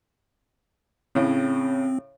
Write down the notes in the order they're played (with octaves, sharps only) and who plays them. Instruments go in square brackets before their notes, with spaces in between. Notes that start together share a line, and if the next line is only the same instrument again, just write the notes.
[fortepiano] A2 C#3 [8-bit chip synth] C4